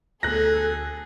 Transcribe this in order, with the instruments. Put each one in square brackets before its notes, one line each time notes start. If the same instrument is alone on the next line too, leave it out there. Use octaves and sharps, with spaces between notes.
[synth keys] D2 [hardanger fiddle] G#4 [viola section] A4 [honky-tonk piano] F#6 A#6